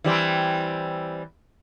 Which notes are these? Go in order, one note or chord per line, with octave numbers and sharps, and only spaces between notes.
E3 G3 C4